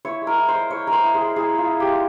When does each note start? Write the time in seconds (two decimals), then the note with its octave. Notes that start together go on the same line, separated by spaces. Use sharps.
0.05 E4 C#5
0.21 G#3
0.27 A#4
0.37 E4
0.48 C5
0.54 G#3
0.70 E4 C#5
0.87 G#3 A#4
0.93 C5
1.04 E4
1.14 G#4
1.20 G#3
1.36 E4 G#4
1.53 G#3
1.58 F4
1.69 E4
1.80 G4
1.86 G#3